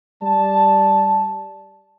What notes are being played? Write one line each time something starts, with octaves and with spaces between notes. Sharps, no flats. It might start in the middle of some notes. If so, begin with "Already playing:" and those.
G3 D5 A5